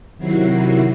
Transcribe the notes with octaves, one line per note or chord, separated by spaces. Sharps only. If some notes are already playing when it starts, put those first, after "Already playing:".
C3 D#3 F#3 E4 F#4 C7